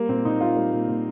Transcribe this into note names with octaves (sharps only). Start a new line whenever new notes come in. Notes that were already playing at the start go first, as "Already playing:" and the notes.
Already playing: G3 A#3
A#2 C4
A#2 D#4
G3 F4
G3
A#2
A#2